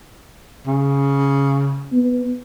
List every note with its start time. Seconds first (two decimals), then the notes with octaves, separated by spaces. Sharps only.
0.66 C#3
1.92 B3